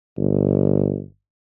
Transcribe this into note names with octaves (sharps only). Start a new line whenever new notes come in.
G1